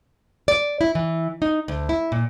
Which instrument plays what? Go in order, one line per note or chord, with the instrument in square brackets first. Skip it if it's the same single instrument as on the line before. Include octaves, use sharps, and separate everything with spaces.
[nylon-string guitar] D5
E4
E3
D#4
D2
E4
A#2